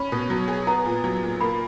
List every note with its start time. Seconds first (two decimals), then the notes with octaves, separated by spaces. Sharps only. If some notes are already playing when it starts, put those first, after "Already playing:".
Already playing: C#4 B5
0.12 B2
0.30 F#3
0.48 G#4
0.67 B3 A#5
0.85 A#2
1.04 F#3
1.23 A#2
1.41 A#3 B5